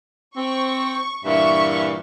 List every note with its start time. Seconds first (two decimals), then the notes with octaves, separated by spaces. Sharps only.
0.36 C4 C#6
1.25 G2 A#2 E3 E5 C#6